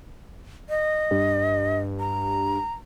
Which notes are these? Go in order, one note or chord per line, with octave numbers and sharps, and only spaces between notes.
D#5
G2
A#5